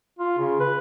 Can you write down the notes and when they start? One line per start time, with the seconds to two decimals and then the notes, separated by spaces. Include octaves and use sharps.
0.19 F4
0.38 C#3
0.60 B4